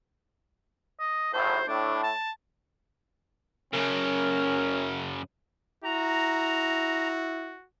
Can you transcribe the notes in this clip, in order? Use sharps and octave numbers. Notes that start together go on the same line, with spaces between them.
D#5
G#1 A2 C5
A2 D4
A5
F#2 C#3 C#4 A#4
E4 F#4 A#5